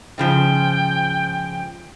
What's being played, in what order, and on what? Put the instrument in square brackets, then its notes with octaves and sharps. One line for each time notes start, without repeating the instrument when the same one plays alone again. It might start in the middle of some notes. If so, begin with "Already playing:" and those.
[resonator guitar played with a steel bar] G#2 C#3 F3 [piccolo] G5